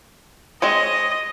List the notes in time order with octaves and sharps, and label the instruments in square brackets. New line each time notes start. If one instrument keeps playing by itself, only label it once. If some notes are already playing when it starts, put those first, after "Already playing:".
[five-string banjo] G#3 C4 C#5 [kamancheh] D#5